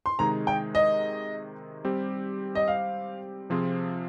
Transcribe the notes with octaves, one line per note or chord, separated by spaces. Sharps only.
C6
C3 D#3 G#3 D#4 G#4 A#5
G5
D#5
G3 C4 G4
D#5
F5
C3 F3 C4 F4 G#4